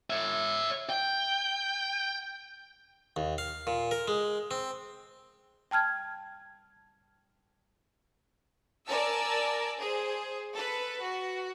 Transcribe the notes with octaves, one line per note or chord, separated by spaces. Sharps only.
C#5 E5
G5
D#2
F5
A#2
A#4
G#3
C4
G5 A5 F6 G#6
A#4 D5 G#5 A5 E6
G#4 C5
A4 B4
F#4